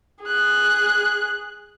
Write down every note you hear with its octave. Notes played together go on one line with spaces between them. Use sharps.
G#4 F#6